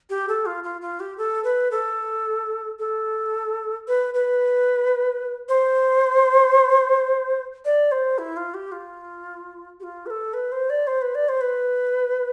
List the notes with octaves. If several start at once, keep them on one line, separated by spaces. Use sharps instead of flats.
G4
A4
F4
F4
F4
G4
A4
B4
A4
A4
B4
B4
C5
D5
C5
E4
F4
G4
F4
G4
F4
B4
A4
B4
C5
D5
C5
B4
D5
C5
B4